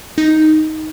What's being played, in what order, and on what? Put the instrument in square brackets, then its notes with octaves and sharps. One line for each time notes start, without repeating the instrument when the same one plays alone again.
[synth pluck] D#4